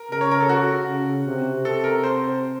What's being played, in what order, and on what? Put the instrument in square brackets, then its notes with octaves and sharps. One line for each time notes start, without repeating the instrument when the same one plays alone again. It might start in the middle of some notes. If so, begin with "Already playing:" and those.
Already playing: [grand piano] A#4
[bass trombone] C#3 [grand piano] A#4
[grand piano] C#5
A#4
A4
F#4
[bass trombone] C#3
C3
[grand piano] A4
A#4
C5